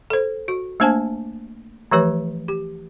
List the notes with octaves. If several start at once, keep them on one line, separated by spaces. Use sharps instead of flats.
A4 C5
F#4
A3 A#3 D4 C5 G#5 A5
E3 F3 A3 G4 B4 C#5
G4